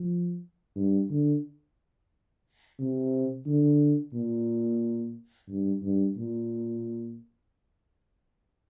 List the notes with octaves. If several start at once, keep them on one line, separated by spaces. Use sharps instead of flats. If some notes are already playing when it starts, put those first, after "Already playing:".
Already playing: F3
G2
D3
C3
D3
A#2
G2
G2
A#2